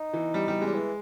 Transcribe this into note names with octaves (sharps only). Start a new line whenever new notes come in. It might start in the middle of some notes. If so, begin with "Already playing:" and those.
Already playing: D#4
E3
G3
G3
G#3
G3
E3